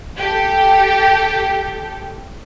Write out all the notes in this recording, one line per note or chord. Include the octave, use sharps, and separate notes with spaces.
G4 A4